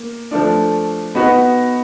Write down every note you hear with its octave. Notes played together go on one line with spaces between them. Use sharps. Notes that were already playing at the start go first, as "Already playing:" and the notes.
Already playing: A#3
F3 A3 D4
B3 D#4 F#4 B4